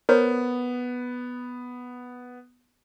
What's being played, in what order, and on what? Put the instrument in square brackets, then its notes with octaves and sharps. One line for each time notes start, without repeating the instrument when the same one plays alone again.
[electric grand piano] B3 [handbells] A#4 C5 C#5